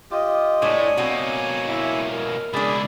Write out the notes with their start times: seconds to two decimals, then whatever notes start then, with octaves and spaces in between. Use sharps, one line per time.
0.11 F4 G4 D#5
0.62 A2 G3 A3 D4 C#5 G#5
0.97 B2 A#3 C4 F#4
1.67 E4
2.10 A#4
2.54 C#2 B2 D4 E4 G#4 D5 B5